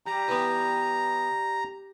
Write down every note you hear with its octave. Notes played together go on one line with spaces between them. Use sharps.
G3 A#5
E3 B3